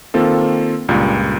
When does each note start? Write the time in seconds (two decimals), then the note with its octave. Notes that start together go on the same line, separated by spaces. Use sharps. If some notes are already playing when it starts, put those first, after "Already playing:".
0.14 D#3 A#3 C4 F4 A4
0.89 C#2 G2 A#2